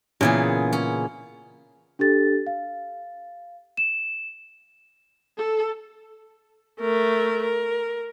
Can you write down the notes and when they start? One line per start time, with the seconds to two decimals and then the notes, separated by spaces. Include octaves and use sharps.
0.21 A#2 C#3 E3 B3 G#4
0.73 C#4
1.99 D4 G4 A4 A6
2.47 F5
3.77 E7
5.38 A4
6.80 A3 A#4
7.43 A#4